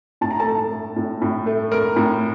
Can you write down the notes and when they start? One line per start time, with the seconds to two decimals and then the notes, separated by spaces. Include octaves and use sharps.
0.21 A2 A5
0.31 A#5
0.40 A4 A5
0.47 A3
0.72 A3
0.96 A2
1.22 A2
1.46 A3
1.71 A3 A#4 A#5
1.96 A2